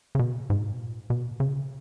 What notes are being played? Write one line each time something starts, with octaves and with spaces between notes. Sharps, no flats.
C#3
B2
G#2
B2
A#2
B2
C#3